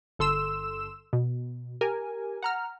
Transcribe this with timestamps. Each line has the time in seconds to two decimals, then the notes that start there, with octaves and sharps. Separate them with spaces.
0.19 G1 A4 C6 E6 E7
1.13 B2
1.81 G4 A#4 G#5
2.42 F#5 A#5 F6